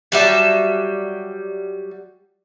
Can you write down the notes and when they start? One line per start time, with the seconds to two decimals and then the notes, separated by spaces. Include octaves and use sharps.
0.12 F#3 G3 E5 A5